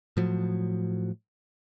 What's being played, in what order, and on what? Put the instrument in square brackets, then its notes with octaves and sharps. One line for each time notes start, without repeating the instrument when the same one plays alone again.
[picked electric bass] A2 F3 F#3